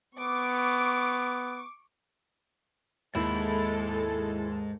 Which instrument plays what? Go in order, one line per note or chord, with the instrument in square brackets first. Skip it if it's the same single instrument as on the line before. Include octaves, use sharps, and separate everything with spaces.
[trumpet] B3 [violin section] C#6 D6
[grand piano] D#2 [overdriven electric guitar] G#2 [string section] G#3 A4 [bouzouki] E4